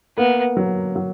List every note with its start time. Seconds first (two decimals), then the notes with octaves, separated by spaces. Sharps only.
0.18 A#3 B3
0.57 F#3
0.96 F#3